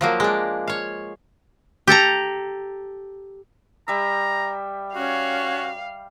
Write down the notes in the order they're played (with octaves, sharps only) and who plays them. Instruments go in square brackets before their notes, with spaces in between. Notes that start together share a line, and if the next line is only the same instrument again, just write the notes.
[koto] F3 F#3 A#3
G#3 D4
C#5 F5
G4 A4 A5 A#5
[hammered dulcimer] G3 E5 [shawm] A#5
[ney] C#4 [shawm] F#4 [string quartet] F5